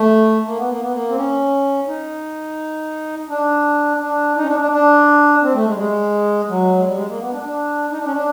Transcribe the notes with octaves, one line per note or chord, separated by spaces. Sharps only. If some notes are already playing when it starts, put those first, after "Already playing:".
Already playing: A3
A#3
B3
A#3
B3
A#3
C4
C#4
D#4
D4
D4
D#4
C#4
D4
D4
D4
C4
A3
G#3
G3
G#3
F#3
G#3
G3
G#3
A#3
B3
D4
D4
D#4
D4
C#4
D4